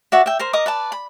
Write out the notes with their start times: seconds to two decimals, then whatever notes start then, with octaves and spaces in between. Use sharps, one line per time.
0.12 F#4 D5 E5
0.26 E5 G5
0.39 A#4 C5 C6
0.53 A#4 D#5 D6 D#6
0.66 B4 D5 A5
0.92 B5